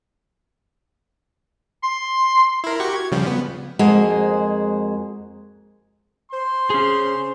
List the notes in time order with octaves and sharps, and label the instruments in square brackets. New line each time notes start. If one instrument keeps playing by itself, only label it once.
[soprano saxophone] C6
[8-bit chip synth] E4 A#4
F#4 G4 C#6
G#6
C#3 F3 G3
B3
[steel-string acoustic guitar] F2 G#3 A#3 F#4 G#4 C5
[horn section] C5 C6
[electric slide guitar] C#4 G#4